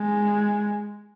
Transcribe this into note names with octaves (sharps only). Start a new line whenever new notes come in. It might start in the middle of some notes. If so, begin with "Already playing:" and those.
Already playing: G#3